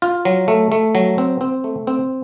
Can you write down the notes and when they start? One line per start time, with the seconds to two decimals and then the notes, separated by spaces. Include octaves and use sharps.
0.02 F4
0.25 F#3
0.48 A3
0.72 A3
0.95 F#3
1.18 C4
1.41 C4
1.64 A3
1.87 C4